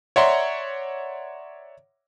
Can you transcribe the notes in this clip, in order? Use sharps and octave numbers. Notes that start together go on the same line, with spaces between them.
C#5 D5 E5 F#5 A#5 C6